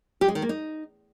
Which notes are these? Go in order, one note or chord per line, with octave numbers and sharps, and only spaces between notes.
G4
G#3
D#3
A#3
D#4